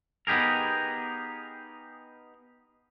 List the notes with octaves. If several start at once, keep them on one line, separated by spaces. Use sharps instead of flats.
B3 D#4 G4 G#4 A#4